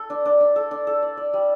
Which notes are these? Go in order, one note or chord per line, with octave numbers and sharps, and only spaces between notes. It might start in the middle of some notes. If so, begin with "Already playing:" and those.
Already playing: A4
D4
D4
D4
A4
D4
A4
D5
D5
G3